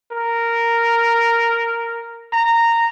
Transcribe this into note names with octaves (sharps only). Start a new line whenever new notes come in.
A#4
A#5